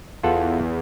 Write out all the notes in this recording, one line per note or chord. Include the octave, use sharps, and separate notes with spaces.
E2 F4 A4 F#5